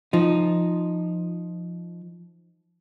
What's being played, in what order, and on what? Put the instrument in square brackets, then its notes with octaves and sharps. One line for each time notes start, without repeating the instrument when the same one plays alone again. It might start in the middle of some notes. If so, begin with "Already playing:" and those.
[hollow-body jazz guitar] F3 D#4